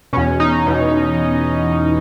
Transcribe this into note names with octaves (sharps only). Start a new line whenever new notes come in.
E2 B2 C#4
D#4
E2 B2